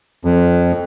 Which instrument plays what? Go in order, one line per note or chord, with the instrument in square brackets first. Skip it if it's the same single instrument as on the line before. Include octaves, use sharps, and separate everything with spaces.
[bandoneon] F2